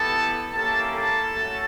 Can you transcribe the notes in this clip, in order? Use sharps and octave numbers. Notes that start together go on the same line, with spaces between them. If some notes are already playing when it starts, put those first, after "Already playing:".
Already playing: B3 E4 G4 A4 A5
A#3 C#4 E4 G4 A4 A5
A4 A5
A3 C#4 F#4